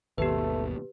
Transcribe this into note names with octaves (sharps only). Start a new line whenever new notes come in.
G#1 D#2 B2 A3 G4 B4